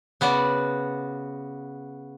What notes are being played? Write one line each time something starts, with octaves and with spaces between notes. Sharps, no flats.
C#3 B3 F#4 D5